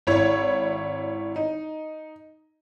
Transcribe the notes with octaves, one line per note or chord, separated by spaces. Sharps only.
G#1 E4 C#5
D#4